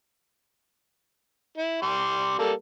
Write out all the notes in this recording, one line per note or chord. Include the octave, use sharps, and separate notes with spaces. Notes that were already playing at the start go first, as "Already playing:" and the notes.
E4
G3 C6 D6
G3 A#3 A4